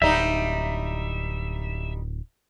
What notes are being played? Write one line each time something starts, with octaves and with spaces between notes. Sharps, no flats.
D1 G3 D#4 E5